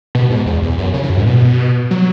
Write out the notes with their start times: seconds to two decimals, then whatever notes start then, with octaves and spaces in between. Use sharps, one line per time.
0.15 B2
0.30 G#2
0.46 E2
0.62 E2
0.78 F#2
0.94 C#3
1.03 E3
1.10 F#2
1.18 G#2
1.26 B2
1.91 F#3